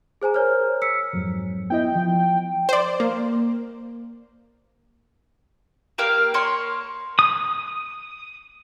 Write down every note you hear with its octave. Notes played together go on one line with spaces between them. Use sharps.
G#4 C5 G#5 A#5
A#4 C5 C#5 A#5 F6
E6 B6 C#7
F2 G#2 F#3
B3 E4 D#5 G5
F3
C5 D5
A#3
A#3 G4 A#4 F5
A#3 C#5 C6
D#6